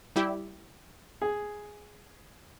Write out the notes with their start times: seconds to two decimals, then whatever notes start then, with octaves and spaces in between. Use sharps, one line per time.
0.16 G3 E4 G4
1.22 G#4